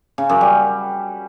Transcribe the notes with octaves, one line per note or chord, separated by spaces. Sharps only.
C#3
F#2
G3